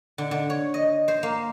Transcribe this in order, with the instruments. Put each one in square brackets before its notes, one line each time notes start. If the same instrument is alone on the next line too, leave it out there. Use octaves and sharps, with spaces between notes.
[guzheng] D3
D3
C#5
D#5
C5
A#3